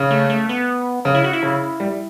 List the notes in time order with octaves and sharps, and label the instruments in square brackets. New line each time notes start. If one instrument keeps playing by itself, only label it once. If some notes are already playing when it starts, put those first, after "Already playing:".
Already playing: [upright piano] C#3
[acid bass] A3
A3
B3
[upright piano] C#3
[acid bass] E4
F#4
E4
[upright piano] C#3
G3